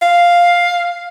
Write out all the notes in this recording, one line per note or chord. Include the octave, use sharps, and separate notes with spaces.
F5